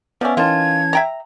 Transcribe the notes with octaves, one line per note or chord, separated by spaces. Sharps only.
F3 B3 C#4 D5 E5
D#3 E3 C#4 F4 A5 G#6
E5 G5 A#5